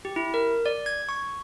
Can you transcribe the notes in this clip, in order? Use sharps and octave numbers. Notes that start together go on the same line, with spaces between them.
G4
E4
A#4
D5
G#6
C#6